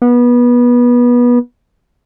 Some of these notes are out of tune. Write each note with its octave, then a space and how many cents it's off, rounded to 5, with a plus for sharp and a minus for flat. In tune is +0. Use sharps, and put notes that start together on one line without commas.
B3 -25